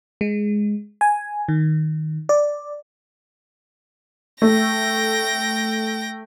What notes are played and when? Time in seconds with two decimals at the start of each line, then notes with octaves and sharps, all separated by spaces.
0.21 G#3
1.01 G#5
1.49 D#3
2.29 D5
4.42 A3 G5 A#6